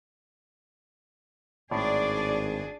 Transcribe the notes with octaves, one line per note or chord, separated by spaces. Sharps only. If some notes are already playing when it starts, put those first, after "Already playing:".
G#1 A2 D4 G#4 D5